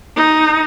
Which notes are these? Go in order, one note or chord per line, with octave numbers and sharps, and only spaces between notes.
D#4